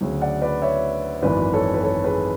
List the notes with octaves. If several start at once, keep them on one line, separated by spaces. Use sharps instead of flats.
D2 C#3 F#3
D5 F#5
B4 D5
C#5 E5
G#1 F#2 E3 B4 D5
A4 C#5
B4
A4 C#5
G#4 B4